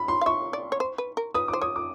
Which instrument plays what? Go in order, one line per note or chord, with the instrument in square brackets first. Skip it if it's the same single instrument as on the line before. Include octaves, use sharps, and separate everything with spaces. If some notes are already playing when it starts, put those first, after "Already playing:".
Already playing: [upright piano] B5
C6
[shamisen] F5
[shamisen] E5 [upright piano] C#6
[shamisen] D5
C#5
C5
B4
A#4
[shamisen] B4 [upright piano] D#6
[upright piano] D6
[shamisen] C5
[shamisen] C#5 [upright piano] D#6
[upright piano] D6